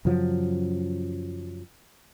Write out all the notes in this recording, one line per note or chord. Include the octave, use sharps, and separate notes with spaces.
F#2 C#3 F3 F#3